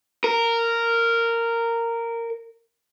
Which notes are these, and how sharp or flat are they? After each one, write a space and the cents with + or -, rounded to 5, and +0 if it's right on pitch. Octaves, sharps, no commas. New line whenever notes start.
A#4 -10